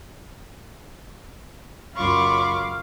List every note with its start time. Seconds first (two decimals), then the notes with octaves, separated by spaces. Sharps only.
1.96 C#2 F#2 F4 F5 B5 C#6 D6